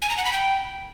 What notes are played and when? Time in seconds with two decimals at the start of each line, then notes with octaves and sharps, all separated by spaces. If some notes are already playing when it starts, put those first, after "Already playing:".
0.02 G#5
0.10 A#5
0.17 F#5
0.25 B5
0.33 G5